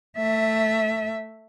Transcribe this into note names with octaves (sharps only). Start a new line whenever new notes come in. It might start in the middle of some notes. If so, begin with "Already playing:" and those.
A3 E5